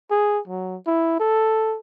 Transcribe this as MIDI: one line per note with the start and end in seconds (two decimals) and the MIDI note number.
0.11 0.39 68
0.48 0.76 54
0.87 1.17 64
1.20 1.77 69